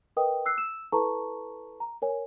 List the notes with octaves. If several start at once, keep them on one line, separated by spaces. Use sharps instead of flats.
A#4 B4 D#5 G5 D#6
E6 F#6 C7
E6 E7
E4 A4 B4 A5 A#5 C#6
A#5
A#4 C#5 G#5